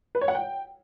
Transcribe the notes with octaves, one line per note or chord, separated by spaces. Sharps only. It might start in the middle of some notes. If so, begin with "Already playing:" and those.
B4
C#5
F#5
G5